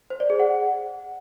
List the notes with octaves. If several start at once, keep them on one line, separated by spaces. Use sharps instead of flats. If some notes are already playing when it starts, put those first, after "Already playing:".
C5
D5
G#4
F#5